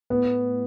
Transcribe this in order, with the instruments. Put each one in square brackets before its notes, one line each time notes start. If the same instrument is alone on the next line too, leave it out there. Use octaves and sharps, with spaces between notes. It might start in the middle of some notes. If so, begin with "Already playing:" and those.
[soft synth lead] A2 [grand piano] B3